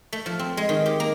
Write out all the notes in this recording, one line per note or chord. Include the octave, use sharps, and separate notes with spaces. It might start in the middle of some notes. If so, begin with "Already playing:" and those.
A3
F3
C4
G#3
D#3
G4
A#3